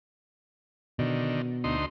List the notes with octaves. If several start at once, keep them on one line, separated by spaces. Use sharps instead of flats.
B2 D3 D#3
D2 D#4 C6